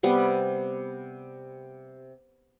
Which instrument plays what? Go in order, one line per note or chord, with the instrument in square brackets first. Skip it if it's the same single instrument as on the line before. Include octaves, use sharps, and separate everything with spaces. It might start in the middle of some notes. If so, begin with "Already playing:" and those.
[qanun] C3 G3 B3